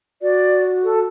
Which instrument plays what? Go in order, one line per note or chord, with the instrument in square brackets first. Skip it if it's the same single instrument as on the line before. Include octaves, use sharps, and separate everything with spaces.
[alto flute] F#4 [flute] D5
[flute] A4